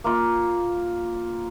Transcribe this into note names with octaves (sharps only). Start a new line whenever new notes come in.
A#3 F4